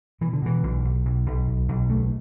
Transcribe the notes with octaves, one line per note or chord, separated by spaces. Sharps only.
B2 E3
D3
B2 E3
B1
B1
B1
B1
B1
B1
D2 A3